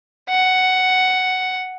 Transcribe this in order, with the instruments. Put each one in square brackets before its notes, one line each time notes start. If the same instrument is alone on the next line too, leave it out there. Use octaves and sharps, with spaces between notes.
[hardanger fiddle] F#5